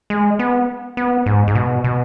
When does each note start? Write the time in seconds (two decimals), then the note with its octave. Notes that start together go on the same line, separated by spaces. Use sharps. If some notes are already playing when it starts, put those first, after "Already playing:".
0.10 G#3
0.39 B3
0.97 B3
1.26 G#2
1.48 G#2
1.55 B2
1.84 B2